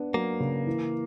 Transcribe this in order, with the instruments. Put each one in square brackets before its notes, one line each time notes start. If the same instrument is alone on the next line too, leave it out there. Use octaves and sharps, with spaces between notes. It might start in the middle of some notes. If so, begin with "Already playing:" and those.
Already playing: [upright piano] B3 D4
[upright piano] F#3 [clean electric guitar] A#3
[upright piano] C#3
E3